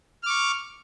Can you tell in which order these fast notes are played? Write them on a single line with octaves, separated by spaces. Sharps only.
F6 D6 C#6